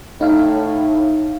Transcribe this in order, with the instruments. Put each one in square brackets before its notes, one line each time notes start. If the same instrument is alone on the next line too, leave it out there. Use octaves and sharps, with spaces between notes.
[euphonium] A2 [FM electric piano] D#4 F5